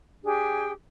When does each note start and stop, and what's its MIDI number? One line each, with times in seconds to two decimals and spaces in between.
0.24 0.71 62
0.24 0.71 67
0.24 0.71 68
0.24 0.71 79